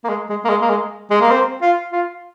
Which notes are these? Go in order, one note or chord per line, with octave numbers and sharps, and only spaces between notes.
A#3
G#3
G#3
A#3
G#3
A#3
G#3
G#3
A#3
C4
F4
F4